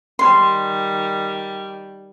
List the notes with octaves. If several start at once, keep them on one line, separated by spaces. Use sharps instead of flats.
D#3 G3 C6